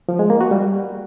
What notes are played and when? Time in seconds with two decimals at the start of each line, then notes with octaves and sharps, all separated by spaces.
0.09 F3
0.19 G#3
0.30 A#3
0.41 F#4
0.51 G3